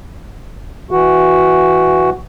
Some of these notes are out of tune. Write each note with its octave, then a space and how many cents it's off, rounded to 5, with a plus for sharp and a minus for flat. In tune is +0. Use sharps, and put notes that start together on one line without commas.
E3 +0 F#4 +0